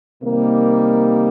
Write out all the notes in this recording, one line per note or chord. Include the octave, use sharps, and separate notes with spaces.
C3 D#3 G3 A#3 D#4